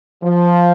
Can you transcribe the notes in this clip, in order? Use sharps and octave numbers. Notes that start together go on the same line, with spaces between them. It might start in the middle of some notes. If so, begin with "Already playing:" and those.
F3